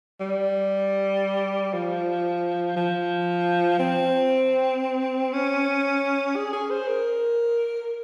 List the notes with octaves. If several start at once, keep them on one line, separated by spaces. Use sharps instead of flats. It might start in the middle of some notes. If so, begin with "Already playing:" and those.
G3
F3
F3
C4
C#4
G#4
G#4
C5
A#4